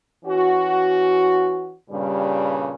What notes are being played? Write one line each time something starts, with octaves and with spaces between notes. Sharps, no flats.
E3 C#4 F#4
G2 A#2 C#3 G3